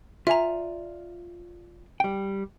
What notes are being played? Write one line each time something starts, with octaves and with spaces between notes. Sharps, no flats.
F4 D5 E5 G#5 A#5
G3 G5